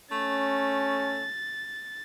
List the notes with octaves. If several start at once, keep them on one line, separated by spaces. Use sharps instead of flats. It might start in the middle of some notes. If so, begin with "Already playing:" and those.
A3 C#4 A6